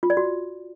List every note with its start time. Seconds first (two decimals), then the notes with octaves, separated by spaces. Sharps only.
0.03 F4
0.10 D5
0.17 F#4